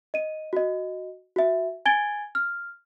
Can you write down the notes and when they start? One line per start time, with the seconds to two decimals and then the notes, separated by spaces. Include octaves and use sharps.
0.14 D#5 D#7
0.53 F#4 D#5
1.36 F#4 E5
1.86 G#5 G#6 A6 D7 G7
2.35 F6